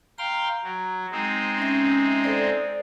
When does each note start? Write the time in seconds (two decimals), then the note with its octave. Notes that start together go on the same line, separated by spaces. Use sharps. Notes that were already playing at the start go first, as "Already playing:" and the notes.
0.18 F5 G5 A#5 C6
0.63 F#3
1.12 G#3 C4 D#4
1.58 C#4 E5
2.24 A4 C5 D5